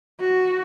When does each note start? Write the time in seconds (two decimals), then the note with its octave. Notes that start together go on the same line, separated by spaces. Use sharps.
0.20 F#4